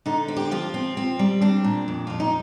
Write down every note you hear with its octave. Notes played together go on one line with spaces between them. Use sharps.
D3 D#4
C4
G4
F3 F4
C4
C4
G3
C4 D4
A#2
F2
F2 F4
D#4